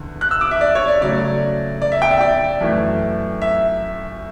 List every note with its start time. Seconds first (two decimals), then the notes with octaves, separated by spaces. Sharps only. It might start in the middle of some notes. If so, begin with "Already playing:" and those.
Already playing: E2 D3
0.21 F#6
0.31 E6
0.41 D6
0.51 E5
0.61 D5
0.75 C#5
0.88 D5
1.01 C#3 F#3 A3 D5
1.82 D5
1.92 E5
2.02 G5
2.11 E5
2.21 D5
2.61 F#2 E3 A3
3.42 E5